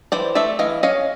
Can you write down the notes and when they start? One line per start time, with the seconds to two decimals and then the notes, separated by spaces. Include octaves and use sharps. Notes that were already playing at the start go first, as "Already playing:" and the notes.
0.12 E3 C5 D5
0.35 A3 D5 E5
0.59 E3 D#5 F5
0.83 C#4 D#5 F5